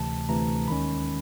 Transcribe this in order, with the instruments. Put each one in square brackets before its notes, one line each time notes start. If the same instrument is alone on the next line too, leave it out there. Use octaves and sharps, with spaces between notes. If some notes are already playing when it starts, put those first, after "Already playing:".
Already playing: [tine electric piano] D2 C3 E3 A3 A5
D2 C3 E3 A3 A#5
D#2 D#3 G#3 C#4 B5